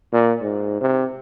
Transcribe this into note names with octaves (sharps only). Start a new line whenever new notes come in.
A#2
G#2
C3